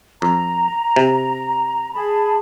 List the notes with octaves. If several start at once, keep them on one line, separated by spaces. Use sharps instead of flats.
F2 A#5
C3
G#4 A5 B5